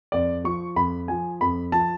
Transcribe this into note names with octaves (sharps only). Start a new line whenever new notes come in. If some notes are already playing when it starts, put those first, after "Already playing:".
F2 D5
F3 C#6
F2 B5
F3 G#5
F2 B5
F3 A5